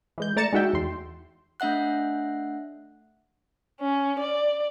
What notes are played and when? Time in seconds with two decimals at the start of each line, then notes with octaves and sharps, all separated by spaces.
0.18 E3 G#3 G6
0.36 A3 D5 A#5 A6 C#7 E7
0.53 G#3 D#4 F#4 E5 G5
0.73 E2 C6
1.60 A3 D4 E5 F#5 F#6
3.81 C#4
4.19 D5